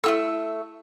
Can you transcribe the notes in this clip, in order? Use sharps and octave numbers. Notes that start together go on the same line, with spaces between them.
A3 E4 F4 A4 E6